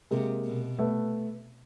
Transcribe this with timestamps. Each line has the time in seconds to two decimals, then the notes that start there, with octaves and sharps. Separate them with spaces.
0.11 C3 G#3 A#3
0.45 B2
0.78 A3 B3